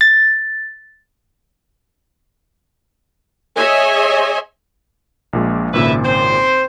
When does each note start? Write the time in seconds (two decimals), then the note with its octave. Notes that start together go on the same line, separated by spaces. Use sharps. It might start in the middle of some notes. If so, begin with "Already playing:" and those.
0.01 A6
3.56 G#4 C#5 D#5 E5 G#5
5.33 A#1 A#2 G#3
5.73 G#1 A#2 C#3 E4 B4 E5
6.04 C4 C5